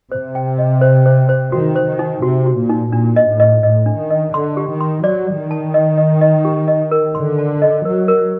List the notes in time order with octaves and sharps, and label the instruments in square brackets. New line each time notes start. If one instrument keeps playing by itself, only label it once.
[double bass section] C3 [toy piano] C5
[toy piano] G5
D#5
C5
C5
C5
[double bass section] D#3 [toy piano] F#4
[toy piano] C5
[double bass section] D#3
[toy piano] D#4
[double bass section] C3 [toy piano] F#4
[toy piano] F#4
[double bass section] A#2
[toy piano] D#4
[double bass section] A#2 [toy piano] D4
[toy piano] D#5
[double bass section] A2
[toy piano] D#5
[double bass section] A2 [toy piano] D#5
[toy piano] D4
[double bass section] D#3
[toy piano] D#5
[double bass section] D3 [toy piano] C6
[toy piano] G4
[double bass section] D#3
[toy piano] C6
[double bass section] F#3 [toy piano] D5
[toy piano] D5
[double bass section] D#3
[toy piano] A5
D#5
D#5
D#5
G4
D#5
A#4
[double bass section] D3 [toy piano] C6
[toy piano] A5
D#5
[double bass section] F#3 [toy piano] A#4
[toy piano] A#4